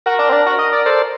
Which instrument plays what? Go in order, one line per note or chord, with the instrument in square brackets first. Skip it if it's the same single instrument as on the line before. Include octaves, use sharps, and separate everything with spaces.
[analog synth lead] F#4 [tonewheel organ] A#4
[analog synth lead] D4
C4
D4
F#4
D#5
D5
[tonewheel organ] A4 C5 [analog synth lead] D5